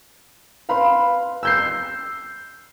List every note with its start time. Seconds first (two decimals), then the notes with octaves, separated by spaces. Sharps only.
0.69 B4 F5 B5 C6
1.43 E6 G6 C7